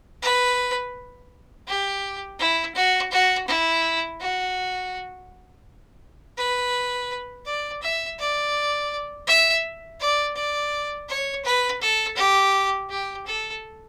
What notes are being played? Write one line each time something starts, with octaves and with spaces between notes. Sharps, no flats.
B4
G4
E4
F#4
F#4
E4
F#4
B4
D5
E5
D5
E5
D5
D5
C#5
B4
A4
G4
G4
A4